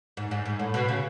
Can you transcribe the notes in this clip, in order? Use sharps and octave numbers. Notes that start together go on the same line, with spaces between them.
G#2
G#2
G#2
A2
B2
C#3